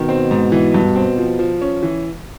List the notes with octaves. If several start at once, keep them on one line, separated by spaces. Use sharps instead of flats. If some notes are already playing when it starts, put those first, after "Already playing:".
Already playing: B2 D#3
C4
G#2
E3
G2
C4
F3
F3
C#4
E3